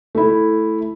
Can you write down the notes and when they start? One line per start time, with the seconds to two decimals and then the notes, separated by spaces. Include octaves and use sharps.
0.15 A3 E4